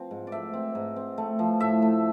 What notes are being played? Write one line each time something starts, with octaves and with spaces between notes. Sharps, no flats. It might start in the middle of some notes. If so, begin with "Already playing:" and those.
Already playing: F3 C4
G#2
D5
A3 E5
C4
G#2
C4
A3
F3
A2 E5
A3